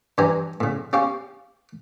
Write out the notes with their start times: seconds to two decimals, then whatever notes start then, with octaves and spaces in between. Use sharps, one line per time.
0.18 G2 E3 D4 G4 G#5 A#5
0.60 A2 C#3
0.93 C#4 G4 F5 C#6